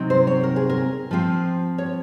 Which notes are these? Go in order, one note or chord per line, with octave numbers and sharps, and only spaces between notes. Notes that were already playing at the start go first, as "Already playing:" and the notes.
Already playing: C3 F#3 C4 D#4
C5
C#5
A#4
G#4
A#4
F3 C4 F4
C#5